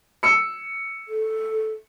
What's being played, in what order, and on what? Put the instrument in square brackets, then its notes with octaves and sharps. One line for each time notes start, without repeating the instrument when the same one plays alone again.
[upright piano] E6 C#7
[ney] A4